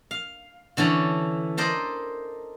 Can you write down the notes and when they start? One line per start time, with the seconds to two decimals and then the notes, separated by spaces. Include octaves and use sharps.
0.11 F5
0.77 D3 E3 C#4 A4 D5
1.57 A4 A#4 C5 D5 D#5